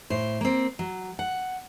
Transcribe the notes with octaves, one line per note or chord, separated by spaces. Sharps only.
A2 C5
A#3 C4
F#3
F#5